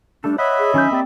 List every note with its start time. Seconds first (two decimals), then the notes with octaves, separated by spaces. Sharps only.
0.24 G3 A3 D4 A4
0.38 C#5 D#5 E5 F#5 B5
0.60 G#4
0.74 D#3 F#3 C#4 G6
0.91 A#3 C4 G4 D5